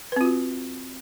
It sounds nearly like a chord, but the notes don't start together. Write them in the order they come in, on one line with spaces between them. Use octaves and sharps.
B4 C4 F4 F#4